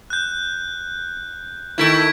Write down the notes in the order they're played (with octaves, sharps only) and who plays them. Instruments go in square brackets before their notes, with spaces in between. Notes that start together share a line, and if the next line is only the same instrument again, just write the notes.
[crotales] F#6 G6
[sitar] D#3 A3 E4 [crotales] G#6 B6 D7